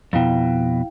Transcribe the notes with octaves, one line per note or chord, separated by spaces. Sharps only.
F2 B2 E4 F5 G5